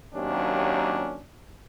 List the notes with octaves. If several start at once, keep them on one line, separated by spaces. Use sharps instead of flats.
D#2 C3 F#3 A#3 C#4 D4